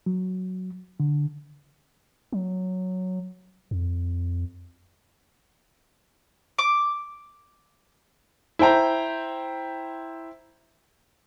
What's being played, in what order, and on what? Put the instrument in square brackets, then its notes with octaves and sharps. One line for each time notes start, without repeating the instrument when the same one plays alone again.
[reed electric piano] F#3
D3
[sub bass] F#3
F2
[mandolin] D6
[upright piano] E4 C5 G5 A#5